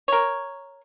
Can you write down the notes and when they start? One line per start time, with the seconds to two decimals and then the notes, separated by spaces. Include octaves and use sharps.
0.08 A#4 C#5